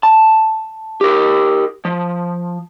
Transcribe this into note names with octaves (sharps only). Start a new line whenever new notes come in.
A5
G4 A#4
F3